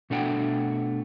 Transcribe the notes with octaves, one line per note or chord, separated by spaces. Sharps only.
B2 A3 D4 F#5 G5